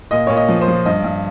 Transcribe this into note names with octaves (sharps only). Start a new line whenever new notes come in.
A#2 D#5
A#2 C#5
D#5
F3
C5
F3
G2 D#5
G2